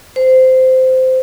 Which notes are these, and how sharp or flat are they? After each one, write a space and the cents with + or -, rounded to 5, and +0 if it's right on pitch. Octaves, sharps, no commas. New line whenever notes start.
C5 -15